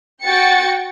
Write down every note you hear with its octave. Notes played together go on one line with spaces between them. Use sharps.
F#4 G5 A6 C#7